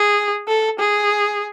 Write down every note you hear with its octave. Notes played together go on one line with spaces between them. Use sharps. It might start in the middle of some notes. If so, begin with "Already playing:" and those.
Already playing: G#4
A4
G#4